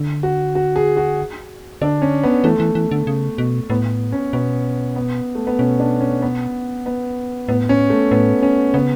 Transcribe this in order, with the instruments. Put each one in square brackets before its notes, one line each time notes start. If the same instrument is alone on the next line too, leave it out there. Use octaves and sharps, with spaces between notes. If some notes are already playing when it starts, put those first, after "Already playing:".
Already playing: [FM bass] D3
[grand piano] F#4
F#4
G#4
F#4
[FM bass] D3 [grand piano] D4
[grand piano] C#4
B3
[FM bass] E3 [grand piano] A3
[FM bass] E3
E3
D3
C#3
B2
[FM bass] A2 [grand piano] B3
[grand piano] C#4
[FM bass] B2 [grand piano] B3
[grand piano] B3
A3
B3
[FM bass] B2 [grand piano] C#4
[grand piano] D4
C#4
B3
B3
[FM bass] A2 [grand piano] B3
[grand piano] C#4
A3
[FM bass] A2 [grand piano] B3
[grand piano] C#4
[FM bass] C#3 [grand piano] B3